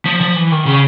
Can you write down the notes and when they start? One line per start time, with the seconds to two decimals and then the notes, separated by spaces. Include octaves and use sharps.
0.05 F3
0.21 F3
0.36 E3
0.51 D#3
0.66 C#3